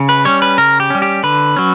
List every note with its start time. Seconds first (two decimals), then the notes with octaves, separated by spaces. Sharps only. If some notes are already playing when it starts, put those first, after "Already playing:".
Already playing: C#3
0.09 B4
0.25 G3 C#4 C#5
0.42 B4
0.58 C#3 A#4
0.80 G4
0.90 G3 C#4
1.02 G4
1.23 D3 B4
1.56 F#3 C#4